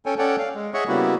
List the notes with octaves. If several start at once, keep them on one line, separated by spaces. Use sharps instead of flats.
C#4 A4 C#5 G5 G#5
C#4 A4 C#5 D5 F#5 G5
F5
G#3
G#4 C#5 D#5 E5 F#5 C#6
C#3 G3 A#3 B3 E4 F#4